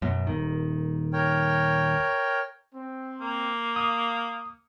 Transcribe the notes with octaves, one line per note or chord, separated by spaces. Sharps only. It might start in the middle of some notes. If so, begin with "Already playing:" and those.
F#2 B2
D#1 D#3
A#4 C#5 G5
C4
A#3
F5 D#6